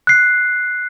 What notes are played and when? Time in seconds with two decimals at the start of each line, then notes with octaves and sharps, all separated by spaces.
0.07 F#6 C7